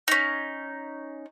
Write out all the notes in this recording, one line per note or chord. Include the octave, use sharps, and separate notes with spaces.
C#4 D#4